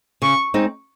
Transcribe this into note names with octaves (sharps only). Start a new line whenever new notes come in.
C#3 C#6
G#3 C4 D#4